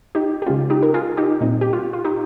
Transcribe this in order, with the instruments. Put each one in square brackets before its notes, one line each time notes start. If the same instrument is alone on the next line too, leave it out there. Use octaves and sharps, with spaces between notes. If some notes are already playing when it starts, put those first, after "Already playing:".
[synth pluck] D#4 G4
G4
C#3 G#3 C#4 F4
D#4 G4
A#4
F4 G#4
D#4 G4
A#2 G3 C4 D#4
G4
F4
F4
D#4 G4